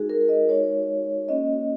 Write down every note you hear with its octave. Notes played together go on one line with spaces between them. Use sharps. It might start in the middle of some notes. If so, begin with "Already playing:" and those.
Already playing: G#3 D#4 F#4 G#4
A#4
D#5
G#3 D#4 F#4 C#5
A#3 C#4 F#4 D#5